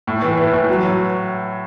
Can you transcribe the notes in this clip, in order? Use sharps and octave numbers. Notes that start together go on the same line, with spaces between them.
A2
E3
E3
A2
F#3